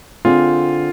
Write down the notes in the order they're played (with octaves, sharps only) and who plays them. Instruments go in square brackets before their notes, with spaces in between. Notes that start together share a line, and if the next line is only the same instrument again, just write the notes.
[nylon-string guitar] D3 C4 G#4 [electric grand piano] F4